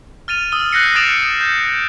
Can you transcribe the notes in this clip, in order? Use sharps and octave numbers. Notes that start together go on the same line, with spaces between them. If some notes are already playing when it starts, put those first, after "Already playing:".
F6 A6 D#7 F7
D#6 E6 G7
F#6 G6 A#6 C7 C#7
D#6 A6 C7 D7 E7 F7
G6